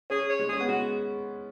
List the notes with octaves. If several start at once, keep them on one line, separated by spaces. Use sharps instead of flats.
C#4 G#4
C#5
G#3
C#4 G#4
B3
G#3 F#4